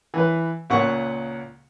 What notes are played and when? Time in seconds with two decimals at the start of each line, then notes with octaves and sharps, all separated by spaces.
0.14 E3 B4
0.70 C#2 A#2 F#5 C#6